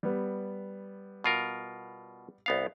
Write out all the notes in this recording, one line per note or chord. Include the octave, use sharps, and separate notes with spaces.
G3 B3
B2 F4 A#4
C2 B3 F5